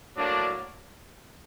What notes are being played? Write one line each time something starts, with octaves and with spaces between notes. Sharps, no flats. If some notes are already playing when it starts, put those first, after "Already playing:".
A2 F#3 A#3 D4